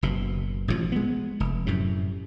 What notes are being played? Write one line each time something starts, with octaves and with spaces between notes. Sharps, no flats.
F#1 B2
A1 B2 D3 F3
G#3 B3
F1
F#2 A2 C3